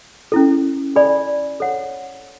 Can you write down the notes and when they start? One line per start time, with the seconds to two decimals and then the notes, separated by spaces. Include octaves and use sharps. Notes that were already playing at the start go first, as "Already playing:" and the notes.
0.32 C#4 E4 A4
0.96 A4 D5 G#5 B5
1.60 A4 C#5 F#5